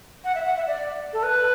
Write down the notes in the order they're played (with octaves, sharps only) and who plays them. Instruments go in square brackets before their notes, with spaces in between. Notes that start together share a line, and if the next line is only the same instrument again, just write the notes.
[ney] F#5
E5
F#5
E5
D5
A4
B4